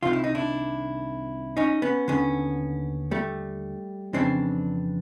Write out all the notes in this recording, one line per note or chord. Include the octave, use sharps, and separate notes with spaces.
C2 C3 D#3 F4
E4
D#4
D4 E4
C#4 D#4
B3 C#4
D#2 D3 B3 C#4
G3 A3
F2 C#3 E3 C4 D4